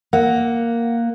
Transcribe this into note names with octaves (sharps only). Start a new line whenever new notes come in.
A#3 A#4 F#5